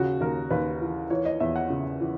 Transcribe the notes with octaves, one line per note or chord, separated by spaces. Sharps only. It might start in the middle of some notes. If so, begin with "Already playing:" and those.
Already playing: D#2 C#3 F#4
D#2 A#4
D#2 B4
E3
E3 C#5
D#5
E2 E5
F#5
C#3
E3